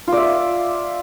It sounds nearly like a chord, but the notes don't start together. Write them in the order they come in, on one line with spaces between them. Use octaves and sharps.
F4 D5 E5